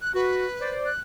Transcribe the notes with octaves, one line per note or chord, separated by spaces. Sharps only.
F#6
F#4 B4
C5 D5
F#6